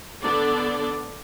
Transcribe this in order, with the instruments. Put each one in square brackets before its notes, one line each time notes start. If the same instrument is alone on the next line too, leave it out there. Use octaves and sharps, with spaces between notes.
[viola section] D3 B3 D4 A4 D5